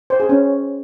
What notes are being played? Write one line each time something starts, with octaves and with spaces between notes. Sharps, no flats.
C5
G#4
C#4